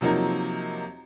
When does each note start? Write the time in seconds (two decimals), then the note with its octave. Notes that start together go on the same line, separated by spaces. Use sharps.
0.01 C3 F3 F#3 A#3 D#4